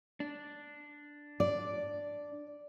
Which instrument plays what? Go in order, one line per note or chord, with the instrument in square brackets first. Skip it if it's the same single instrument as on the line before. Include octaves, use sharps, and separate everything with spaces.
[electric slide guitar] D4
[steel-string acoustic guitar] D5